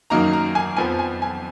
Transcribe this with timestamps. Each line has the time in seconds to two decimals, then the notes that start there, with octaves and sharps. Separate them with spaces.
0.10 F#2 D#3 F#3 A#3 D#4 A#5
0.33 A#5
0.55 G#5
0.77 F2 F3 B3 G#5
0.99 G#5
1.22 G#5